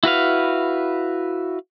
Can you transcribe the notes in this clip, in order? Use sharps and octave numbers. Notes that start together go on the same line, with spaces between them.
E4 F#4 B4 F5